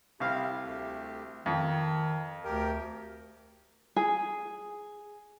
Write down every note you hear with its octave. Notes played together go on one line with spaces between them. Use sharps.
C2 E4 G4 F5
D2 A3 G4
F2 D#3 E6
D2 G4 A#4 G5
G#4